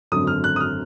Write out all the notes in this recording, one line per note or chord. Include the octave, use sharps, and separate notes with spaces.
G#1 F#2 D3 F#3 D#6
F6
F#6
D#6
F6